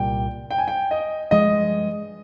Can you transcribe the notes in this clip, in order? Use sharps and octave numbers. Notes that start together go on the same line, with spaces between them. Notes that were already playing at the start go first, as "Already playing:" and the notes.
Already playing: C2 A#2 G3 G5
G5
G#5
G5
D#5
G2 F3 G#3 D#5